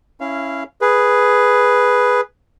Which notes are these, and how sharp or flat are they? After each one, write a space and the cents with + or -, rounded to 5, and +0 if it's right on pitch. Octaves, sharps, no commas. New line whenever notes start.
C#4 +0 E4 +0 F5 -20
G#4 +0 B4 +0